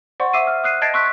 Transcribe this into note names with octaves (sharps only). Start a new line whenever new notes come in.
C5 D5 F#5 C6 C#6
E5 D6 E6 C7 D#7
F6
D#6 F#6 C7 D#7
D#5 A5 G#6 A6 C7 D7
C6 C#6 E6 F#6 B6